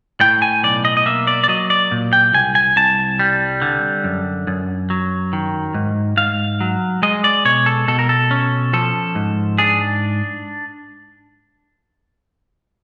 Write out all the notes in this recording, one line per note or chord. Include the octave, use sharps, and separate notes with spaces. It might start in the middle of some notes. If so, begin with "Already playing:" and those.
A2 G5
G#5
B1 D5
D#5
D#5
A#3 E5
D5
D5
F#3 D#5
D5
A#2
G5
C2 G#5
G#5
C2 A5
G3
D3
F#2
F#2
F#3
D#3
G#2
G#2 F5
F#3
G#3 D#5
D5
B2 C#5
A4
B2 A4
A#4
A4
C#4
F3 A4
G#2
D4 G#4